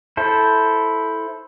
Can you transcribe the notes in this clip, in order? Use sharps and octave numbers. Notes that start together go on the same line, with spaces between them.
E4 A4 C5